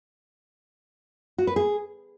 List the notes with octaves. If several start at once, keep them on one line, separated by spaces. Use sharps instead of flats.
F#4
B4
G#4